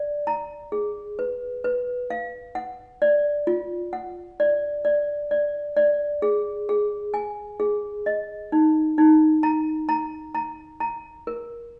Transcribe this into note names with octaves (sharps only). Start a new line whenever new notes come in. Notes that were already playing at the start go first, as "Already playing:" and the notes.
Already playing: D5
A#5
G#4
B4
B4
F5
F#5
D5
F4
F#5
D5
D5
D5
D5
G#4
G#4
G#5
G#4
D#5
D#4
D#4
A#5
A#5
A#5
A#5
A#4